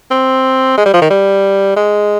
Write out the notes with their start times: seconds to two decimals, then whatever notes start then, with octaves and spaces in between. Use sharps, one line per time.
0.11 C4
0.78 G#3
0.86 G3
0.94 F3
1.02 D#3
1.10 G3
1.76 G#3